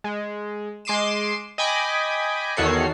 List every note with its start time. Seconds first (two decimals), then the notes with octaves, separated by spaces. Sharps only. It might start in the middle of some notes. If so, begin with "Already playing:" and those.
0.04 G#3
0.85 G#3 C6 D6 C7 D#7 E7
1.58 D#5 G5 G#5 B5 D6
2.57 E2 D#3 F#4 A4 C#5 C7